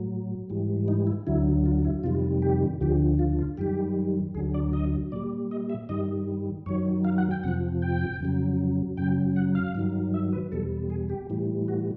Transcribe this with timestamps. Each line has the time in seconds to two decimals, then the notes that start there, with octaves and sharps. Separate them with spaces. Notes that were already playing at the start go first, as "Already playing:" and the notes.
Already playing: A2 F#3
0.50 G#2 E3 G3
0.88 D#4
1.07 E4
1.27 D2 D3 F#3 E4
1.66 F4
1.85 E4
2.03 F2 C3 D#3 G3 F4
2.42 G4
2.81 D2 D3 F3 G4
3.19 F4
3.39 F4
3.57 F#2 D#3 G3 G4
4.35 D2 D3 F#3 G#4
4.54 D5
4.73 D#5
5.12 A#2 G3 D5
5.51 D#5
5.70 E5
5.89 G2 D#3 G3 D#5
6.66 F#2 D#3 F#3 C#5
7.05 F5
7.18 F#5
7.31 G5
7.43 F2 C3 F3 F#5
7.82 G5
8.20 F2 C#3 F#3
8.97 F#2 C#3 F#3 G5
9.36 F#5
9.55 F5
9.75 G2 D#3 F#3
10.14 E5
10.33 B4
10.52 E2 B2 G3 A4
10.90 G#4
11.10 G4
11.30 A2 E3 G3
11.68 F#4